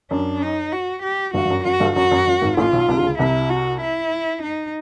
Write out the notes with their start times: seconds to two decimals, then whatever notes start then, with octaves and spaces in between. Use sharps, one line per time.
0.11 F#2 D4
0.42 D#4
0.72 F#4
1.03 G4
1.34 G1 G2 F#4
1.45 G2
1.50 F#2
1.64 F#2 F#4
1.80 G1 G2
1.96 F#2 F#4
2.11 F#2
2.27 F#2
2.41 G#1 G#2
2.57 A1 A2 F4
2.73 B1 B2
2.88 C2 C3
2.98 D3
3.03 C#2 C#3
3.19 C2 C3 E4
3.50 F#4
3.81 E4
4.43 D#4